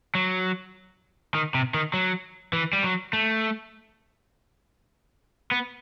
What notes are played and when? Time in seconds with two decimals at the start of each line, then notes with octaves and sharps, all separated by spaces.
0.15 F#3
1.34 D#3
1.54 C3
1.74 D#3
1.94 F#3
2.53 E3
2.73 G3
2.83 F#3
3.13 A3
5.51 B3